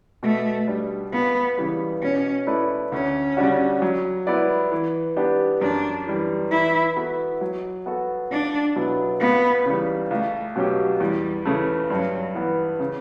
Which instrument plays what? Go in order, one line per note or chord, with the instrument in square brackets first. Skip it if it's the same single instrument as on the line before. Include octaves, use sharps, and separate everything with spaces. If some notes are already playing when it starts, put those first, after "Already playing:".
[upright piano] B2 [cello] A3
[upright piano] G3 D4
[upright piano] C#2 [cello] B3
[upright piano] C#3 E3 G3
[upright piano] B2 [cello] C#4
[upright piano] A3 E4 B4 D5
[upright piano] D2 [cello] C#4
[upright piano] C#3 G3 D4 F#4
F#3
B3 E4 B4 D5
E3
B3 D4 G4
[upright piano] F#2 [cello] D4
[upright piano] E3 G3
[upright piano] E3 [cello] E4
[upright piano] B3 F#4 A4
F#3
B3 F#4 A4
[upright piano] C#2 [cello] D4
[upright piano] B2 F#3 B3 E4
[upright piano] C#2 [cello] B3
[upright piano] C#3 E3 G3
[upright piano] C#2 [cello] A3
[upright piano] B2 F#3 C#4 G4
[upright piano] E2 [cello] G3
[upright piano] C#3 E3 A3
[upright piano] G2 [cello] F#3
[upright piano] E3 B3
C#3